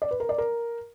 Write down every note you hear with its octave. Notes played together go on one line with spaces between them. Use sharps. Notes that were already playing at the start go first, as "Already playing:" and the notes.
D5
B4
A#4
D5
A#4